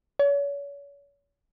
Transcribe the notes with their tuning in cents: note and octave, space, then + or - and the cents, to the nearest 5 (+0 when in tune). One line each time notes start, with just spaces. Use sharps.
C#5 +35